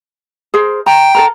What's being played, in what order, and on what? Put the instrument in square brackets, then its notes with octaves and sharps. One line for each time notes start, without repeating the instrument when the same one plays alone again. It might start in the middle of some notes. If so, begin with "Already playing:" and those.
[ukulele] G#4 A#4 C5
[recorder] G5 [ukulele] A#5
[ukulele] A4 A#4 A#5